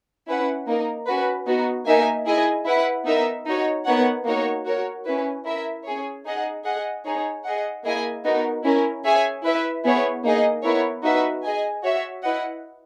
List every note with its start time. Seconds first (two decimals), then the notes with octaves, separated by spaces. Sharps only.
0.27 C#4 E4 B4 F#5
0.67 A#3 D#4 A#4
1.07 C#4 F#4 B4
1.47 B3 D#4 F#4
1.87 A#3 D#4 A#4 E5 G#5
2.27 E4 G#4 D#5 G#5
2.66 E4 B4 F#5
3.06 B3 D#4 A#4 E5
3.46 D#4 F#4 C#5
3.86 B3 D#4 A#4 C#5 F#5
4.26 A#3 D#4 F#4 A#4 C#5
4.66 F#4 A#4 C#5
5.06 C#4 E4 B4
5.45 E4 A#4 E5
5.85 C#4 G#4 C#5
6.26 D#4 G#4 D#5 F#5
6.65 G#4 D#5 F#5
7.05 D#4 G#4 C#5
7.45 G#4 D#5 F#5
7.84 A#3 E4 G#4 D#5 G#5
8.25 B3 D#4 F#4 A#4
8.64 C#4 E4 A#4
9.04 G#4 C#5 E5 G#5
9.44 E4 B4 E5
9.84 B3 E4 G#4 C#5
10.24 A#3 D#4 G#4 D#5
10.64 B3 E4 A#4 C#5
11.03 D#4 F#4 B4 E5
11.44 G#4 D#5 G#5
11.83 F#4 C#5 E5
12.22 E4 B4 D#5 F#5